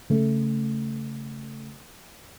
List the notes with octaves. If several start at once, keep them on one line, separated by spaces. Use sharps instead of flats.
C#3 A3